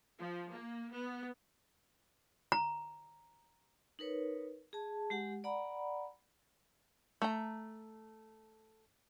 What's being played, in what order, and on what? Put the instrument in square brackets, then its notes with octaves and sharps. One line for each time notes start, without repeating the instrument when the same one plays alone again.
[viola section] F3
A#3
B3
[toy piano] A#5
[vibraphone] D#4 A#4 B4 C#5
G#4 A5
G#3 G4 F#5
D5 F#5 A#5 B5
[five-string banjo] A3 A#5